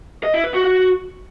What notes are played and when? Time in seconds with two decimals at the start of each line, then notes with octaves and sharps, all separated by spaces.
0.24 D#5
0.34 E4
0.44 B4
0.54 F#4
0.64 F#4